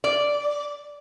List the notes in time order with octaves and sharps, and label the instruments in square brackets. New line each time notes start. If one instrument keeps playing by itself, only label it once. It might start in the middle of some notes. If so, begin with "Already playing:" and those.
[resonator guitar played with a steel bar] D5